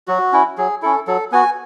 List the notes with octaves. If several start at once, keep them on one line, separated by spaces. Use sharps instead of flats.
F#3 F#4
C#4 E4
F#3 G#4
C#4 E4 A4
F#3 A4
B3 F#4 G#5